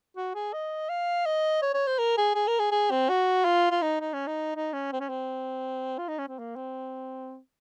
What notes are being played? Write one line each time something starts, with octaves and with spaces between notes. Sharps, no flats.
F#4
G#4
D#5
F5
D#5
C#5
C#5
C5
A#4
G#4
G#4
A#4
G#4
G#4
C4
F#4
F4
F4
D#4
D#4
C#4
D#4
D#4
C#4
C4
C#4
C4
F4
D#4
C#4
C4
A#3
C4